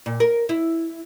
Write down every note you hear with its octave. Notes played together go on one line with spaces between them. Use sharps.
A#2
A#4
E4